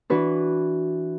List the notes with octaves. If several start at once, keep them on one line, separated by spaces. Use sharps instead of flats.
E3 D4 F#4 B4